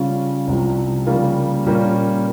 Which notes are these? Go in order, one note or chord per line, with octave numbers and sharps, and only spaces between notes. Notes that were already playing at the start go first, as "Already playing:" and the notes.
Already playing: C#3 G3 C#4 F4
C2 C3 F3
C#3 G3 A#3 F4
A#2 G3 A#3 C#4